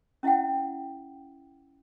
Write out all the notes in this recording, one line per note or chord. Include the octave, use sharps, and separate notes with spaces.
C#4 E4 E5 F#5 G5